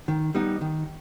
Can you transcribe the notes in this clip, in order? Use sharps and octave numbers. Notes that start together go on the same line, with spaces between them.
D#3
G3 B3 D#4
D#3